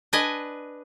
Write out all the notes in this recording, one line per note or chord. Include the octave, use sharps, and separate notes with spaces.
D4 B4 D#5 G#5